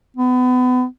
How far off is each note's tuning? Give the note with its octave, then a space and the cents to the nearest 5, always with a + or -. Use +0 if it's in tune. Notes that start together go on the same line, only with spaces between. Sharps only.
B3 +30